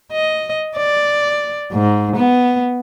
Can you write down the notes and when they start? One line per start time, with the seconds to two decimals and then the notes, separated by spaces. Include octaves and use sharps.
0.12 D#5
0.77 D5
1.72 G#2
2.16 B3